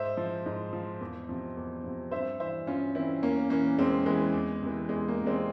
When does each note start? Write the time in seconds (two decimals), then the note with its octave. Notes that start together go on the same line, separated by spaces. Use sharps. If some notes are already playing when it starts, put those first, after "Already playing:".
Already playing: G#2 C5 E5
0.17 F3
0.46 G#2
0.73 F3
1.01 E2
1.29 C3 F3
1.56 E2
1.84 C3 F3
2.11 G2 C5 E5
2.40 E3 C5 E5
2.67 G2 C#4 F4
2.95 E3 C4 E4
3.22 E2 A#3 C#4
3.50 E3 A#3 C#4
3.78 E2 G#3 C4
4.06 E3 G#3
4.34 E2
4.62 C3 E3
4.89 E2 G#3
5.08 A#3
5.17 C3 E3
5.26 G#3 C4